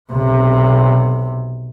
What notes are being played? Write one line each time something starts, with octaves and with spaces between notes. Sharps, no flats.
B1 C3